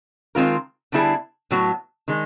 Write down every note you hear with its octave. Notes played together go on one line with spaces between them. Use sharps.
D#3 G#3 C4 F4 A#4
D3 G3 B3 E4 G#4
A2 F#3 B3
D#3 G#3